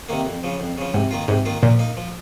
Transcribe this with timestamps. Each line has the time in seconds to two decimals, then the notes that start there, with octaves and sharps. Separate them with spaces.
0.09 C3 D#3 A#3
0.26 F2
0.43 C#3 F3
0.60 F2
0.78 C#3 F3
0.94 G#2 C3
1.11 D#3 A#3 F4
1.28 G#2 C3
1.45 D#3 A#3 F4
1.62 A#2 F3
1.79 A#3 D#4
1.97 F3